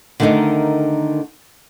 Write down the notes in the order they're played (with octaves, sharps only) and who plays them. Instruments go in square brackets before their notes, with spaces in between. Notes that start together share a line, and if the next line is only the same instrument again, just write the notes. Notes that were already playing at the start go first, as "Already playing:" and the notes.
[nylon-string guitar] D3 D#3 A3 C4 D#4 A#4